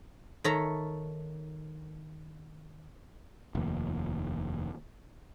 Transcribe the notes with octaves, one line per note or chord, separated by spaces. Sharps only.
D#3 A4 C#5 E5 A#5
F1 D#2